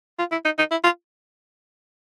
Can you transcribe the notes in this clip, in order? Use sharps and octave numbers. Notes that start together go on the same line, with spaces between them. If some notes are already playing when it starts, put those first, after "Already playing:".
F4
E4
D#4
D#4
E4
F4